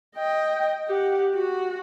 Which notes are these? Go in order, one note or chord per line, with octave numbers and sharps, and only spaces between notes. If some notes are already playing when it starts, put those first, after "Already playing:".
D#5 G5
G4 F#5
F#4